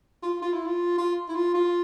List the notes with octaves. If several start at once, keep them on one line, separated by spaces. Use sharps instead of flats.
F4
F4
E4
F4
F4
E4
F4
F4